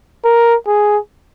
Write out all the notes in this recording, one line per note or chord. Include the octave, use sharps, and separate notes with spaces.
A#4
G#4